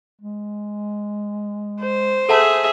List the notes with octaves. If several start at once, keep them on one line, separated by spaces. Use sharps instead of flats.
G#3
C5
G#4 A4 E5 F#5 A5